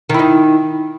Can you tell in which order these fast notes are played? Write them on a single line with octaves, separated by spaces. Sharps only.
D#3 E4 D#4